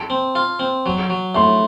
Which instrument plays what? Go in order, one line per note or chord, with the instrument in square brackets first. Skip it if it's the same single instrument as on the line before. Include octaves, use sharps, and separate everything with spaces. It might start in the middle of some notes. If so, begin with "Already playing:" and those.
Already playing: [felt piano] A5
[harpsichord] C4
F4
C4
F#3
F#3
[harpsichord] A2 [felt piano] C6